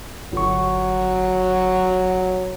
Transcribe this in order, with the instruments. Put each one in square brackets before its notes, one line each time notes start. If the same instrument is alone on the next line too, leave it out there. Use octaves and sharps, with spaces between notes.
[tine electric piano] G1 C#6 [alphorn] F#3